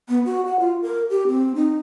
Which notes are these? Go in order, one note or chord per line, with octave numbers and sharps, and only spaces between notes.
B3
F#4
F#5
F4
A#4
G4
C4
D#4